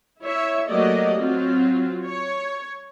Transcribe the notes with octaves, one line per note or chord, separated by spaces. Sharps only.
E4 C#5 E5
F#3 A3 A#3 G4 D5 D#5
F#3 C4 F4
C#5